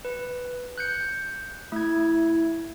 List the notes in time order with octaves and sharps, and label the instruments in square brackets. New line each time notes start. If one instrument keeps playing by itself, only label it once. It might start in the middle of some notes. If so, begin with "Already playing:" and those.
[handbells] B4
F#6 G6 C#7
[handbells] A3 G#6 [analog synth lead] E4